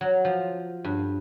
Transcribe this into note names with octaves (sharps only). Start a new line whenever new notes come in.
F#3
F3
G2